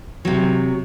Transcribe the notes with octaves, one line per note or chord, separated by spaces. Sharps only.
C3 F#3